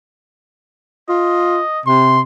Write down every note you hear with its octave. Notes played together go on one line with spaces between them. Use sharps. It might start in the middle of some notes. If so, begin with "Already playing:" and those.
F4 D#5
C3 C6